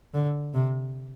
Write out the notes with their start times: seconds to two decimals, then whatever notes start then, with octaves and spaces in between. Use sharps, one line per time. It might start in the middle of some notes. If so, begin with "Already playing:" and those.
0.14 D3
0.54 C3